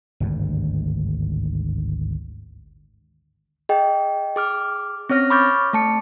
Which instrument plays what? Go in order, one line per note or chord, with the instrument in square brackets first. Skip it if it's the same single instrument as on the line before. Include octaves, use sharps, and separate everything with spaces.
[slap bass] G#1 D2 G2
[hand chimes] G#4 D#5 G5
G#4 D6 F6
C4 C#4 C#5 F6 A#6
B5 C#6 D6 F6 G6 A6
A3 A5 C#7